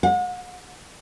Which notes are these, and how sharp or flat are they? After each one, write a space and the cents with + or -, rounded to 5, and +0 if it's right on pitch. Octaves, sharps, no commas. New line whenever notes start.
F#5 -40